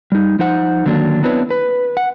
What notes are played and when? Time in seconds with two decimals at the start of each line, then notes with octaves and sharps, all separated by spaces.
0.12 G3 D#4
0.39 F3 D#4 C5 F#5
0.86 D3 D#3 F#3 A#3 D4
1.23 B3 C4 D4 E4 B4 C#5
1.50 B4
1.97 F#5